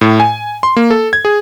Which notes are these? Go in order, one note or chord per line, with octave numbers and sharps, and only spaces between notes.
A2
G#5
C6
A#3
A4
G#6
G#4